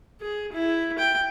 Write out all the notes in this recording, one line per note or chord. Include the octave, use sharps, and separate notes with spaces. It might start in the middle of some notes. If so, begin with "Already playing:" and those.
G#4
E4
G5